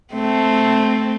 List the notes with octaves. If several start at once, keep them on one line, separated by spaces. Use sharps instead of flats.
A3 C4